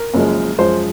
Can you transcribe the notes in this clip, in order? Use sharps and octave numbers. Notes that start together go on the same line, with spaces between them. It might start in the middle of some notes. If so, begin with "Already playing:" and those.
Already playing: A#4
F#1 F#2 F3 G#3
F#2 F3 G#3 C5